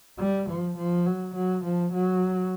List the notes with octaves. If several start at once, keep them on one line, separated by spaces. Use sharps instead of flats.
G3
F3
F3
F#3
F#3
F3
F#3